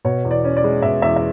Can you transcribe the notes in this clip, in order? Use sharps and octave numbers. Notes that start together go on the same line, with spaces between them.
B2 C#5
E2
D5
C#4
D5
G#3
B2 E5
E2 E5
E5